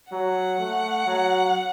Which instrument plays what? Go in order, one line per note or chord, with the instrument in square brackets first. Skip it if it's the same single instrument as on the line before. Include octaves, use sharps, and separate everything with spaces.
[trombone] F#3 [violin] F#5
[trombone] A3
F#3